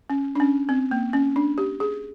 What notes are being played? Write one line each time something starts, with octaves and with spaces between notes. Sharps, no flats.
C#4
D4
C#4
C4
A#3
C#4
D4
G4
G#4